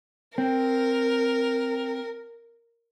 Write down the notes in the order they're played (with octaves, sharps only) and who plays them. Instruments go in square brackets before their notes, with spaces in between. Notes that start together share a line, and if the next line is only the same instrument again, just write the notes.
[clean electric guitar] C4 [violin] A#4